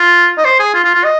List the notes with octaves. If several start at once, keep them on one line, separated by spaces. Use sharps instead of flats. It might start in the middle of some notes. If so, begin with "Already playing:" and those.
Already playing: F4
D#5
C5
G#4
F4
F4
F4
D#5